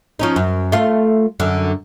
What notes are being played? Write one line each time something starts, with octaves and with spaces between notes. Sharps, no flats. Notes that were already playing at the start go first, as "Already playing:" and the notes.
F3 C#4 D#4
F#2
A3 F4
F#2 D3